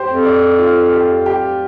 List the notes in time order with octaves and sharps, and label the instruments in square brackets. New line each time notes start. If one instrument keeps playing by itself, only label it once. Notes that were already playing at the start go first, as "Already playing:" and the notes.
Already playing: [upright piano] G4 C5
[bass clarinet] F2
[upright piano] D5
F4
G4
G4